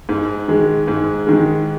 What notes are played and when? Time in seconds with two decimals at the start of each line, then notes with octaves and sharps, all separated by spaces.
0.09 G#2
0.48 D#3 G#3
0.88 G#2
1.27 D#3 G#3